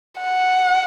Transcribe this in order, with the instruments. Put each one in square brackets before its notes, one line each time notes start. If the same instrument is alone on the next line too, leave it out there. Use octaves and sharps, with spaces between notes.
[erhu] F#5